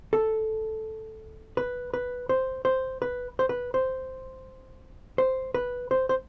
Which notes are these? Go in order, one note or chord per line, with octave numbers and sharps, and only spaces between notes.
A4
B4
B4
C5
C5
B4
C5
B4
C5
C5
B4
C5
C5